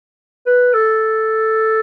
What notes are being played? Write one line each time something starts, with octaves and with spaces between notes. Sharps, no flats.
B4
A4